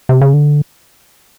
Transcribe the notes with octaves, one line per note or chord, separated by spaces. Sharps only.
C3
C#3
D3